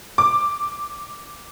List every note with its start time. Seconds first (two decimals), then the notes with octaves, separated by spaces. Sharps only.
0.18 D6